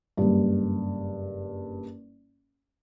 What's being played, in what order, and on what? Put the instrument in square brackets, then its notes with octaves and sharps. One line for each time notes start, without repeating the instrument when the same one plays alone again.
[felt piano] F#1 G2